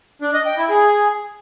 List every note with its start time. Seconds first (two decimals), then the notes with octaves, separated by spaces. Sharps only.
0.22 D4
0.34 D#5
0.46 G5
0.58 E4
0.70 G#4